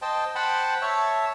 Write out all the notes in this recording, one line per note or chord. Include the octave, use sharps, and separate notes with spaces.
C5 D#5 G5 A5
C5 F#5 G5 A5 B5
C#5 E5 A5